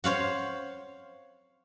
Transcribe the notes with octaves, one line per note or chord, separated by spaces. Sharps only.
C5 C#5 F5 F#5